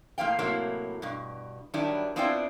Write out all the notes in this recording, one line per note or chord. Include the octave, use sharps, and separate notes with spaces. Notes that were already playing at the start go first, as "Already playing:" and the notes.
A2 F3 A#3 F5 G5
A2 C3 F#3 A#3 E4
G2 B2
D#3 F#3 G3 D4 E4
B3 C4 D4 E4 F4 G5